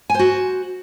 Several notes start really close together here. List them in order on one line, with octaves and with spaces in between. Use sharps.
G#5 C5 F#4